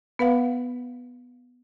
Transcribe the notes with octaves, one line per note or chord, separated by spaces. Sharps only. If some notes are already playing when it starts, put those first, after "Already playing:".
B3 B4 F5 F#5